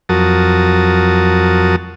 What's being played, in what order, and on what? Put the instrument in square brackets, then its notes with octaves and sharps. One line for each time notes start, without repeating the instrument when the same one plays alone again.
[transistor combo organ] F2 F#3 F#4 A#4 A5 D#6